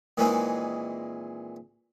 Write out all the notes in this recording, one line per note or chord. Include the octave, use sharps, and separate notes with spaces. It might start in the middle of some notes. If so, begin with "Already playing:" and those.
A#2 D#3 E3 G#3 C4 D#4